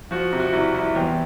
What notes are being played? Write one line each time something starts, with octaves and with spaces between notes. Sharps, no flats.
F3 F#4
C3
F#4
C2
C2
E2 G4